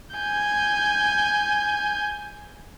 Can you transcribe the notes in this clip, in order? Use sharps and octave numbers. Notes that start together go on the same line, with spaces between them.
G#5 G6